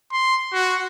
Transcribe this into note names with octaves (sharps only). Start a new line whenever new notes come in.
C6
F#4